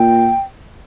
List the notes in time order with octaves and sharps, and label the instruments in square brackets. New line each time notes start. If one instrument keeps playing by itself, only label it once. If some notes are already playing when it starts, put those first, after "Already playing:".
Already playing: [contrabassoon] A#2 [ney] G5